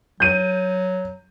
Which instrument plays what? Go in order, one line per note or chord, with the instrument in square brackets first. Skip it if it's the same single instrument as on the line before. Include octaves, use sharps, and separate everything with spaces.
[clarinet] F#3 [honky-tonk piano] G6 D#7